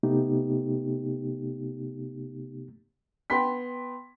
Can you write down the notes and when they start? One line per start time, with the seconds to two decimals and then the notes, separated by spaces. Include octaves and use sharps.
0.03 C3 A3 B3 D#4 G4
3.30 B3 G5 B5 C6 B6